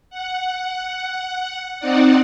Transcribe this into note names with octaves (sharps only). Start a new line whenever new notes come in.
F#5
C4 D#4 D5 F#5